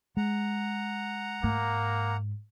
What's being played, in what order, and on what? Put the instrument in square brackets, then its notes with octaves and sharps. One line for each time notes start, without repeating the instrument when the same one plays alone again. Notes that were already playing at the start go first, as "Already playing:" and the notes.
[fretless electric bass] G#3 [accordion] F#5 A#5
[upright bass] G#2 [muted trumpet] A#3